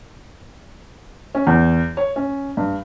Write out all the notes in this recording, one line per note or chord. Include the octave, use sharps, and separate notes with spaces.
C#4
E2
C#5
C#4
G2